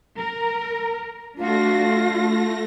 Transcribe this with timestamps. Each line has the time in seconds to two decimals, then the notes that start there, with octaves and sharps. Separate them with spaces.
0.17 A#4
1.38 A3 D4 F4 F#4 A#6